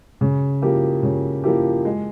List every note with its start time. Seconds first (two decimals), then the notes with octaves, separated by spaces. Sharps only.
0.21 C#3
0.62 F3 A#3 E4 G4
1.03 C#3
1.44 F3 A#3 E4 G4
1.85 G#3